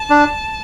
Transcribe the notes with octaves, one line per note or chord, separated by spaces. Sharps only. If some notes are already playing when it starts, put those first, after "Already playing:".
Already playing: A5
D4